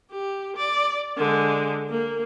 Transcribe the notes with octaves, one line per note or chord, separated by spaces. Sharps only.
G4
D5
D3 G#3
A#3